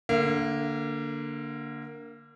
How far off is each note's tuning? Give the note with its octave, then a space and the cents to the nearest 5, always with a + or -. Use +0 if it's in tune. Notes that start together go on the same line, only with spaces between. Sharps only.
D3 +0 A#3 +0 F5 -45